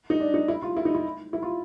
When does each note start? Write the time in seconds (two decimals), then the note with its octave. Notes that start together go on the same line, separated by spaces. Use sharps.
0.10 D#4
0.20 D4
0.34 D#4
0.48 E4
0.62 F4
0.77 E4
0.85 D#4
0.95 E4
1.33 E4
1.42 F4